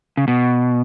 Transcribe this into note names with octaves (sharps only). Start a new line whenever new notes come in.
C#3
B2